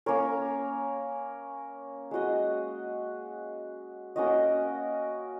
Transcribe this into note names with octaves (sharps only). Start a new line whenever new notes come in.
A#3 C#4 A#4 C#5
G#3 F#4 D#5
A#3 C#4 F#4 D#5